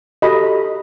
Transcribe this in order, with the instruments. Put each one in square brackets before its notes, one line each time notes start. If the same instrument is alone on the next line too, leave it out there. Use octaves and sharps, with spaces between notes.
[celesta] F#4 G4 A4 [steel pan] D#5 B5